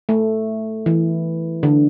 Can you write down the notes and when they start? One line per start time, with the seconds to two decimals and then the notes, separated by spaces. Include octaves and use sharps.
0.09 A3
0.86 E3
1.63 D3